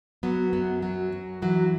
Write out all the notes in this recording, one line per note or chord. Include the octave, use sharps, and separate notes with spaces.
F#3 B3
F#2 B3
F#3
F#2
E3 F#3